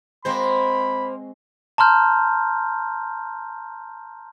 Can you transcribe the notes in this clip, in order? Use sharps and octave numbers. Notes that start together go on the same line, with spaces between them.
G#3 A#3 C4 F#4 C5 B5
A5 A#5 C6 F6 G6